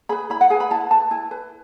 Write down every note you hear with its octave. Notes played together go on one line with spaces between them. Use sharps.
G#4 B4 B5
E4 B5
F#5
G#4 B4 G#5
B5
E4 A5
B4 A5
E4 G#5
B4